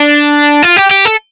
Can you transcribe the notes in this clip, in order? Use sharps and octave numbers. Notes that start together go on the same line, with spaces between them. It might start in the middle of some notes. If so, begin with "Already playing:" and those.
Already playing: D4
F4
G4
G4
A4